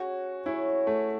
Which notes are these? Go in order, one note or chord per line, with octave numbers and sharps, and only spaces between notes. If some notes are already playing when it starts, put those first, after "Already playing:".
Already playing: C#4 F#4 G#4 C#5
C#4 E4 G#4 C#5
A3